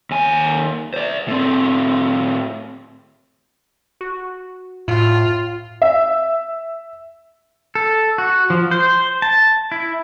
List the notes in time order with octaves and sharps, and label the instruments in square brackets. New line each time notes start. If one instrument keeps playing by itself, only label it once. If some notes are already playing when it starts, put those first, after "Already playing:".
[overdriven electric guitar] D#2 G#5
C5 D5
A2 C4
[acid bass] F#4
[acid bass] A2 [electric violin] F4
[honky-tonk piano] E5
[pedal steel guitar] A4
F#4
F3
C5
A5
E4